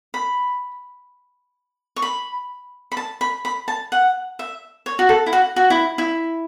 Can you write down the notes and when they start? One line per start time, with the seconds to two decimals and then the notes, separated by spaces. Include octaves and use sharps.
0.14 B5
1.96 C#6
2.02 B5
2.92 B5
2.97 A5
3.21 B5
3.45 B5
3.68 A5
3.92 F#5
4.39 E5
4.86 C#5
4.99 F#4
5.09 A4
5.26 E4
5.33 F#4
5.56 F#4
5.70 E4
5.98 E4